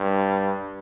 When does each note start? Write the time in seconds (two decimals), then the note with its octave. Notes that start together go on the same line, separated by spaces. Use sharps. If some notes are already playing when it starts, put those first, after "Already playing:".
Already playing: G2